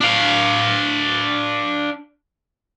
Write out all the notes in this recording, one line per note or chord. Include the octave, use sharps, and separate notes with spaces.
D4 F5